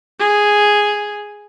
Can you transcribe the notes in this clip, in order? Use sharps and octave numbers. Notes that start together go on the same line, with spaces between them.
G#4